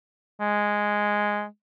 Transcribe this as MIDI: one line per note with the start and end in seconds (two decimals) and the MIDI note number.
0.40 1.45 56